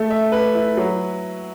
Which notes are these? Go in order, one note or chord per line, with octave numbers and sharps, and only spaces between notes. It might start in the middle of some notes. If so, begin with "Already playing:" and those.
Already playing: A3
E5
B4
E4
F#3